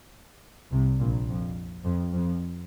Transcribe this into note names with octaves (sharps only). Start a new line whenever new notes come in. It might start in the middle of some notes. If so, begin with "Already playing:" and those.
C2 C3
A#1 A#2
F2
F2
F2